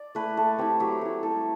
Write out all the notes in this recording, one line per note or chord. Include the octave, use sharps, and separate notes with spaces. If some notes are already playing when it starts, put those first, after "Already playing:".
Already playing: D5
A3 E4 B4
A3 A4
C4 E4 G4
F#3 G4
A3 E4
G3 A4